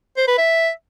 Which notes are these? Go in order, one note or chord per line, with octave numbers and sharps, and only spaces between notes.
C5
B4
E5